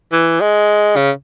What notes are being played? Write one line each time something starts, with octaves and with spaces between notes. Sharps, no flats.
E3
G#3
C#3